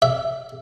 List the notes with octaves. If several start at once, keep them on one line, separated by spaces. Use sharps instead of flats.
E5